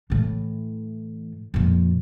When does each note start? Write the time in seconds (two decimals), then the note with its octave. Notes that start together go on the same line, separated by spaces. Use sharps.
0.10 A2 E3
1.54 F2 A#2